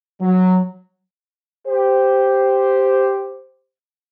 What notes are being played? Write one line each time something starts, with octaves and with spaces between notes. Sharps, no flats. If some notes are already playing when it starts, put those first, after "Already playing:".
F#3
G4 C5